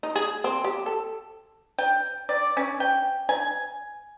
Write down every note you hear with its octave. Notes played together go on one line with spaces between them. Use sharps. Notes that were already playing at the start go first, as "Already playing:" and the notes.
D#4
G#4
C4
G4
A4
G5
D5
C#4
G5
G#5